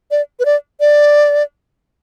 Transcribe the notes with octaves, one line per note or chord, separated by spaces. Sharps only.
D5
B4
D5
D5